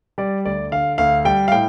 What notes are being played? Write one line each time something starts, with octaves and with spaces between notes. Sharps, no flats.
G3 D5
D2 D5
D3 F5
D2 F5
G3 G5
F5
A2 G5